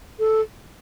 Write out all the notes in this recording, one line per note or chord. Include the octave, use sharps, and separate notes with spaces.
A4